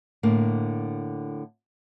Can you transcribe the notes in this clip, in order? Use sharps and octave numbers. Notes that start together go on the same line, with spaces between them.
A2 D3 A#3